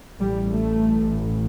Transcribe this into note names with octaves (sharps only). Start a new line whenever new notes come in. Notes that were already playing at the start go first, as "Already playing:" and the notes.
A1 A2 G3
A3